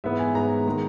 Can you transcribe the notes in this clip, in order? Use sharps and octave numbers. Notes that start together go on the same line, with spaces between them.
G#2 E3 B3 E5
G#5
G#2 E3 B3 A#5
D#3 G#3